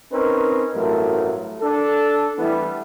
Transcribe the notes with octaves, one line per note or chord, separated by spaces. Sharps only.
C4 C#4 D#4 A#4 B4
A1 G2 F#3 A3 A#4
D4 A4
E3 G3 A3 B3 E4